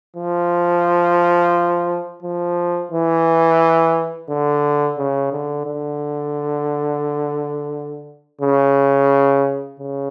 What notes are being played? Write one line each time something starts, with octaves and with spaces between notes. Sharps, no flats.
F3
F3
E3
D3
C#3
D3
D3
C#3
C#3